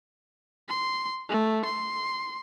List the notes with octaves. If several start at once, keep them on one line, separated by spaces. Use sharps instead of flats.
C6
A3
C6